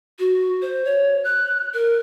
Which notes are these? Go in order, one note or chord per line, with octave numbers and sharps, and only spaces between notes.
F#4
C5
C#5
F#6
A#4